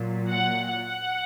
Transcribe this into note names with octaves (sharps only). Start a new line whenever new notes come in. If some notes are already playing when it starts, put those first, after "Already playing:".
Already playing: A#2 F#3
F#5
F#5